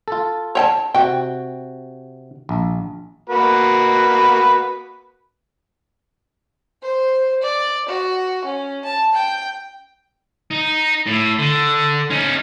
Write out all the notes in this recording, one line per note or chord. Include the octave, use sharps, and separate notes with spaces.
F4 A4
C#5 G5 A5
C3 F#4 G5
A#1
A#3 F#4 B4
C5
D5
F#4
C#4
A5
G5
D#4
A2
D3
C#4 D#4